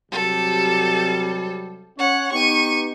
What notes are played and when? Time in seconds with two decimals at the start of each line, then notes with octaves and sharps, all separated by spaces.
0.12 C3 F#3 G3 A4
1.99 C#4 C#5 F#5
2.33 B3 D#4 G4 C#6 D#7